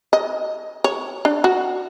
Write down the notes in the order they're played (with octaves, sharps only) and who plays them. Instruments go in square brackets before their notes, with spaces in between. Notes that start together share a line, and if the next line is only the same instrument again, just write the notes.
[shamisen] D#5
C#5
D4
F#4